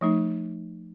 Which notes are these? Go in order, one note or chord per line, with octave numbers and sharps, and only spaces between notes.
F3 A3 D#4